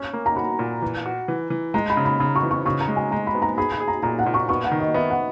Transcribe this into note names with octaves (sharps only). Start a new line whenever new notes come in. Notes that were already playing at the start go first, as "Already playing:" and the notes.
Already playing: C#4 G#5
A#3
A#5
F#4 B5
A#2
E3
F#4
E3
E3
G#3 A#5
B5
C#3
B5
C#3 B5
C#6
E3
C#6
C#3 C#6
A#5
G#3
G#5
G#3 A#5
B5
B3
A#5
G#4 B5
B5
G#4
A#5
A#2 A#5
F#5
A#2
C#6
B3 C#6
F#5
D#3
D#5
B3 E5
F#5